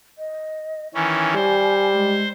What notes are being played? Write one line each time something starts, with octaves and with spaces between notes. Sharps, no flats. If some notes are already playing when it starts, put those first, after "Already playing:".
D#5
D#3 E3 C#4 G#5
G3 C5
G#3